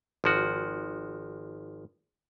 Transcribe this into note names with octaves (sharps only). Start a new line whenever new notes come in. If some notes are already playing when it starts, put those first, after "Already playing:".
G#1 F3 F#4